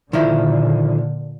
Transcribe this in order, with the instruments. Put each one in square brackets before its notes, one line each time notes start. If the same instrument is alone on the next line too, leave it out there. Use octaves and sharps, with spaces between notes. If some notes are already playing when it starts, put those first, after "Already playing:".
[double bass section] A#2 D3 [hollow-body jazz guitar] D#3 F3 E4